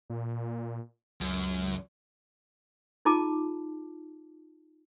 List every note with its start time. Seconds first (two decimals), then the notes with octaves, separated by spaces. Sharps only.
0.10 A#2
1.21 C#2 F#2
3.05 D#4 F4 G#4 A5 A#5 D6